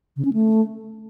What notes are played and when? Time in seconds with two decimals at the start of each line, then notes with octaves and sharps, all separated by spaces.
0.16 C#3
0.25 C#4
0.33 A3